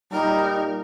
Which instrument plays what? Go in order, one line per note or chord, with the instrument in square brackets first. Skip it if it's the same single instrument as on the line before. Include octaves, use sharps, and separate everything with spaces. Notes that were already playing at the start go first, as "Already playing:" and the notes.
[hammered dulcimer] A#2 [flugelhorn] G3 [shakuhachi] D#4 [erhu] A#4